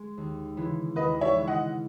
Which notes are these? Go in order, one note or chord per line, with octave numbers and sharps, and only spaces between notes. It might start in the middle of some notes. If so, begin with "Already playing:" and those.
Already playing: G#3
D#2
C#3 E3 G#3
D#2 B4 D#5
C#5 E5
C#3 E3 G#3
D#5 F#5